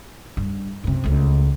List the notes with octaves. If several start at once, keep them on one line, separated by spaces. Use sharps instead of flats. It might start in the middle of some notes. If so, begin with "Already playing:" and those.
G2
F#2 C3
C#2 A3